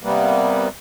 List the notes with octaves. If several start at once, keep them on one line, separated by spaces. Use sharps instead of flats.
C3 G3 A#3 B3